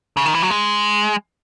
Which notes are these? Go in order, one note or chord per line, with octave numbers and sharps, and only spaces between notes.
C#3
D#3
E3
F#3
G#3